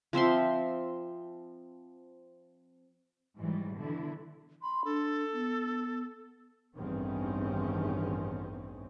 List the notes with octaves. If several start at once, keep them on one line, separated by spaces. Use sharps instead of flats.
F3 C4 E5 C6
G#2 E3 F#3 G3
B2 D3 E3 E4
B5 C6
D4 A4
B3
A1 E2 G2 D#3 C4 C#4